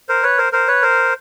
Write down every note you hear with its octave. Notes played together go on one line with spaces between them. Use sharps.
A#4 C5
B4 C#5
A#4 C5
A#4 C5
B4 C#5
A#4 C5